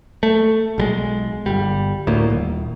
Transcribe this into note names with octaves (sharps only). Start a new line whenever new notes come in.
A3
B1 G3 G#3
G1 G3
D2 A2 A#3
D#1